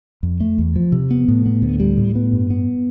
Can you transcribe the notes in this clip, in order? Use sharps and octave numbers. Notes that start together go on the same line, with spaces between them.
F2
A3
E2
F3
C3
B3
A2
B3
D2
G3
A2
B3
G2
B3